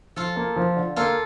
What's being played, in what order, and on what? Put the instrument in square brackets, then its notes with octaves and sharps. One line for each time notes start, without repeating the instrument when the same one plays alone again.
[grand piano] F3 [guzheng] F4 A4
[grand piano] A#3
F3
D3
[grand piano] A#3 [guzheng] F4 A4